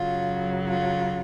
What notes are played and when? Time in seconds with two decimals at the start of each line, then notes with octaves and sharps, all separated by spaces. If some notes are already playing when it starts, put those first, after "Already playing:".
Already playing: F#2 C#3 F#3 F4
0.68 F4